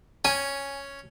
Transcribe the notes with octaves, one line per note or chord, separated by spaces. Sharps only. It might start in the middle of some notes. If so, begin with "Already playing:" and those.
C#4 G#5